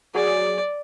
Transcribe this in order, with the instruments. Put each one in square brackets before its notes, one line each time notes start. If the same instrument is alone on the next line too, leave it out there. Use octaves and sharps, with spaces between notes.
[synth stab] F#3 G#4 [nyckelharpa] D5